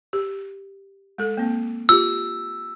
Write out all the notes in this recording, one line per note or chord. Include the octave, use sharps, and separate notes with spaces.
G4
G#3 A4
A#3 C4
F4 G4 E6